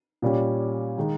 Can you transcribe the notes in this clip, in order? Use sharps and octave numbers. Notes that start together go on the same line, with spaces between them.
A#2 G3 C#4
D#3 G#3 D#4